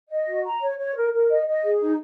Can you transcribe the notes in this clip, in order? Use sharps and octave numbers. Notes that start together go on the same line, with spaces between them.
D#5
F#4
A#5
C#5
C#5
A#4
A#4
D#5
D#5
G#4
D#4